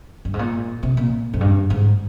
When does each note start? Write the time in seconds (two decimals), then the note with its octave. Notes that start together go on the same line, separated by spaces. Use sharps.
0.25 G2
0.34 G#2
0.39 A#2
0.83 C3
0.97 A#2
1.34 F2
1.41 G2
1.70 G#2